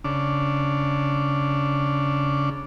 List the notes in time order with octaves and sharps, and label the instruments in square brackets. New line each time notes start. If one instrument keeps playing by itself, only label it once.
[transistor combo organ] C#3 D4